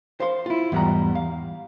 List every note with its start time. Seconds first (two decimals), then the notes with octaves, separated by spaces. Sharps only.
0.20 C5 F5 C6
0.46 E4 F4
0.72 E2 G#2 G3 F#5 A#5
1.15 F5